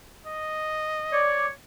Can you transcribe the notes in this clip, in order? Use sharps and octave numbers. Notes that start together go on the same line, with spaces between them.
D#5
C#5 D5